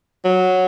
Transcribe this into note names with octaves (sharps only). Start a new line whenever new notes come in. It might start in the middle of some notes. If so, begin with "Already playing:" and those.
F#3